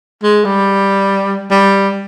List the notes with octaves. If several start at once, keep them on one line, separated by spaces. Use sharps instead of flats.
G#3
G3
G3